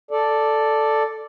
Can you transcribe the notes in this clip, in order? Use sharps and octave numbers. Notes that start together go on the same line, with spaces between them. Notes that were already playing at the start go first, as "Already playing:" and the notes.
A4 D5